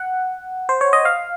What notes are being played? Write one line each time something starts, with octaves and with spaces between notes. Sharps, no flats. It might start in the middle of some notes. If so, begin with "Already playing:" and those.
Already playing: F#5
C5
C#5
D#5
F5